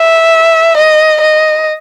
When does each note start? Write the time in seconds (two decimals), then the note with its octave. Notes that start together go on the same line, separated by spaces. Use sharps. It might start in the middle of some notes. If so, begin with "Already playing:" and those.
Already playing: E5
0.77 D#5
1.21 D#5